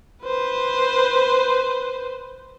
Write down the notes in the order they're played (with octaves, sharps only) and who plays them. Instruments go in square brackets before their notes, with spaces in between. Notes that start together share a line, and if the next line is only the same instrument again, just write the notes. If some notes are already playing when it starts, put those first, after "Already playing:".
[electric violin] B4 C5